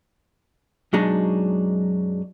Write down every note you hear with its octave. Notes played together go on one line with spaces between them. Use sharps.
F#2 B2 F#3 G#3 D4 D#4